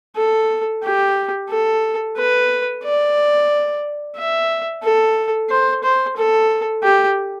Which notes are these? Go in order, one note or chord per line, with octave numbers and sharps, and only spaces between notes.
A4
G4
A4
B4
D5
E5
A4
C5
C5
A4
G4